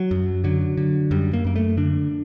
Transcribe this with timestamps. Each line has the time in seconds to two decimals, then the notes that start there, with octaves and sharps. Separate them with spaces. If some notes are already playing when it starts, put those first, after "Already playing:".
Already playing: F#3
0.11 F#2
0.44 D3 F#3
0.77 D3
1.11 F#2 G3
1.33 A#3
1.44 F#2 A#3
1.56 A3
1.77 D3 D4